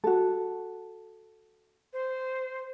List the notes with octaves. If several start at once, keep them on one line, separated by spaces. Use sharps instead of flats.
F#4 A4
C5